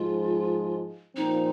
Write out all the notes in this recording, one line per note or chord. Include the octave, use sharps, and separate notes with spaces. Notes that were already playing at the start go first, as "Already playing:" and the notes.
Already playing: G#2 F3 G#3 F4
A#2 F3 C4 D#4